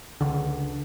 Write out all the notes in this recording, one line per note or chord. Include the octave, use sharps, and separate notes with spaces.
C#2 D3